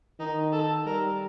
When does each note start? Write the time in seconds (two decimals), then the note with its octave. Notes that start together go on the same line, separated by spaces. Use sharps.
0.20 D#3 D#4
0.52 A4
0.86 G3 A#4